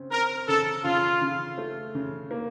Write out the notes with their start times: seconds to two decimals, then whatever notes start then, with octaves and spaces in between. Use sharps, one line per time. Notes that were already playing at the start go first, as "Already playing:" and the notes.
Already playing: C#3 C4
0.11 C4 A#4
0.48 C#3 A4
0.84 C#3 F4
1.21 C#3
1.58 A3
1.95 C#3
2.31 A#3